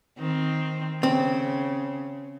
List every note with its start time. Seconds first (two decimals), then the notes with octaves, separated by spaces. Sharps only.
0.19 D#3 C4
1.03 C#3 C4